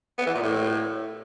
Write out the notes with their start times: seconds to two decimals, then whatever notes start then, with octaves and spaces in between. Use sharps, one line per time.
0.18 B3
0.27 E3
0.35 A#2
0.43 A2